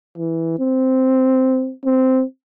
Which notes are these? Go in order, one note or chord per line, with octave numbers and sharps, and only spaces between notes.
E3
C4
C4